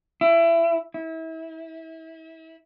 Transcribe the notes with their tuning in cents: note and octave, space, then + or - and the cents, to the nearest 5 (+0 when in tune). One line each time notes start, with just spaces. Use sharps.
E4 +25
E4 -30